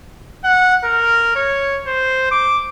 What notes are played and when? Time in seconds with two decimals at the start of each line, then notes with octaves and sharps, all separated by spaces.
0.44 F#5
0.84 A#4
1.36 C#5
1.86 C5
2.31 D6